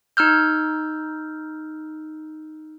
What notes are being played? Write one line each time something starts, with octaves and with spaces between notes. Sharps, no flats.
D#4 E6 F6 G6